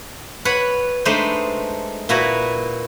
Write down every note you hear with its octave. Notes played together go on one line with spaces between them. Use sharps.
B4 C#5 F#5
G#3 A3 D4 D#4 B4 C5
A#2 E4 F#4 B4 A#5